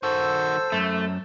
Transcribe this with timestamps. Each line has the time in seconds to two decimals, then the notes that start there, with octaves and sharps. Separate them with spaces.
0.03 D#3 F#4 A4 C5 E6
0.72 F#2 A3